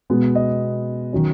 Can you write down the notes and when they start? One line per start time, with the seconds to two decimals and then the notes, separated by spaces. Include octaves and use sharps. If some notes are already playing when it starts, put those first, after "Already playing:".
0.10 B2 G#3 B3
0.35 D#5
1.13 D#3 F#3 C#4